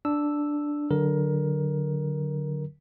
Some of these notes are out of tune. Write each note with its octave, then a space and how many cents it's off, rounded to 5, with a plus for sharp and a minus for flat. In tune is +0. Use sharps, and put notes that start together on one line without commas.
D4 +0 E6 +0
D3 +0 F#3 +5 A#4 +15